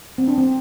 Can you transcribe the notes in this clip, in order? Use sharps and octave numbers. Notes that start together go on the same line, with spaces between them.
C4
D4
C4